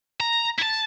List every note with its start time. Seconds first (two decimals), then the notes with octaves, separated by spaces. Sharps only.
0.20 A#5
0.58 E4 A5